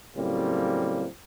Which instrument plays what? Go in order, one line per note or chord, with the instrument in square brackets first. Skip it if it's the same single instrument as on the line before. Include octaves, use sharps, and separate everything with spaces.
[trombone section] A2 C#3 F#3 G3 A#3 C4